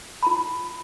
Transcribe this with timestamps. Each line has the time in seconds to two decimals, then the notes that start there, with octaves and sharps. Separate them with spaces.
0.23 F4 A#5 B5